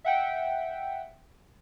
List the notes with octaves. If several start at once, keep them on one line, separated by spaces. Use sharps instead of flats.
E5 F#5 G5